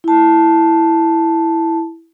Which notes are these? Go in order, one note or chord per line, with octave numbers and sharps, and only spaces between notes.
E4 A5